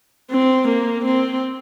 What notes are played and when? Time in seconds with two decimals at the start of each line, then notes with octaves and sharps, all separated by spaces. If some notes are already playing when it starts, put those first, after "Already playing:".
0.31 C4
0.68 A#3
1.05 C4